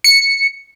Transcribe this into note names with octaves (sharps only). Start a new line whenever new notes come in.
C#7